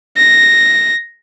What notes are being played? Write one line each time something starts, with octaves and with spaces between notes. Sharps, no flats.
A#6